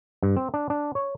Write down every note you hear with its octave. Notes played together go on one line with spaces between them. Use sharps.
G2
C4
D4
D4
C#5